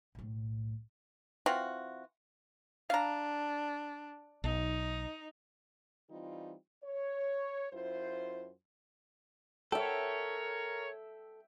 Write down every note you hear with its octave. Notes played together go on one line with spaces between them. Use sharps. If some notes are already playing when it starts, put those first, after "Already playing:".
B1 A2
E3 C4 F4 F#4
D4 F5 A#5
B1 D#4
E3 G3 C4 D#4 F4
C#5
F#2 E4 F4 C5
A4 A#4 C#5 E5 G5